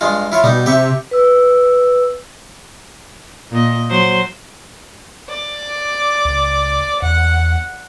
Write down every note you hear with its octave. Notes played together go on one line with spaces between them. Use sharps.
G2 G#3 F4
E4 F4 C#5
B2 G3 D#4
C3 G4 E5 C#6
B4 E6
A#2 D#5
F#3 C5
D5
C#2
E2 F#5